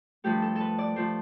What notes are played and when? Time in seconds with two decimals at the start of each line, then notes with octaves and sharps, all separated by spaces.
0.24 G2 F3 A3 G4
0.42 A4
0.55 A4 B4
0.78 D5
0.96 F3 A3 C5